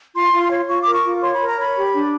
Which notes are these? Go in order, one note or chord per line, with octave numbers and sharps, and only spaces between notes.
F4 C6
F4
C#5
F4 C#6
D6
A#4
C#6
F4
C#5 C6
B5
A#4
A#5
C#5 B5
G4
D4